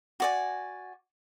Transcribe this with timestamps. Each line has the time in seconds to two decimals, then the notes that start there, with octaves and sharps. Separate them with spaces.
0.20 F#4 D5 G#5